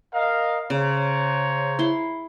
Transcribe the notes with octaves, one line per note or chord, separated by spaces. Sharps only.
A#4 D#5 F5
C#3 C5 C#5 A#5
E4 C6